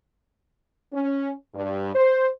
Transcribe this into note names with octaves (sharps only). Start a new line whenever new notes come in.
C#4
G2
C5